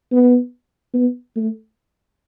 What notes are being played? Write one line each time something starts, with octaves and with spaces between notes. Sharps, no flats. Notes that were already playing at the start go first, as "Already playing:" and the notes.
B3
B3
A3